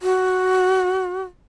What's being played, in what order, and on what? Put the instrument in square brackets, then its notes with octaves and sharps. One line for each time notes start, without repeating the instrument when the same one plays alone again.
[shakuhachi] F#4